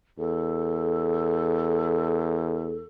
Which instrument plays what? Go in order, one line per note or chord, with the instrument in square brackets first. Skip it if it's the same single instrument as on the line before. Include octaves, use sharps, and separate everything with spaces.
[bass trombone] E2 [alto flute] A4